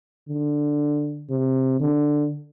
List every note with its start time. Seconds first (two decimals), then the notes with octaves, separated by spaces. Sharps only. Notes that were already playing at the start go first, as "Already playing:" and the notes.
0.29 D3
1.30 C3
1.80 D3